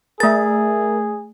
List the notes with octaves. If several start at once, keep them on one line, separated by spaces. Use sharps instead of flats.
A3 G#4 A#4 E5 A6